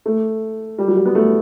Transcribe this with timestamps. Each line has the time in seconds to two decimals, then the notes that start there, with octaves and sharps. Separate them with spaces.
0.06 A3
0.78 G3
0.88 F#3
0.96 G3
1.05 B3
1.15 A3